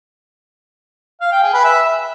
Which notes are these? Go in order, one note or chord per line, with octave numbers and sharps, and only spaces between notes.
F5
G5
G#4
B4
E5